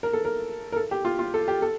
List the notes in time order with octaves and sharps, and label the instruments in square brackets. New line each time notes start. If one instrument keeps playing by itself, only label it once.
[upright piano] A#4
A4
A#4
A#4
A4
G4
F4
F4
A4
G4
A4